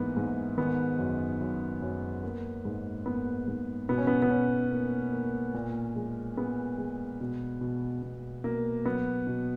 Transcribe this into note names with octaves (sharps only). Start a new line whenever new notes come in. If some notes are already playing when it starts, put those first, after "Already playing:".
Already playing: G#2 E3 G#3 A#3 B3
G#2
D#3 B3
F#2
F#2
F#2
A#3
G#2
A#3 B3
G#2
B2 B3
C#4
B3
B3
B2 C#4
A#3
A#3
A#2
G#3
G#3 B3
G#3
B2
B2
B2
B2 A#3
F#3 B3
B2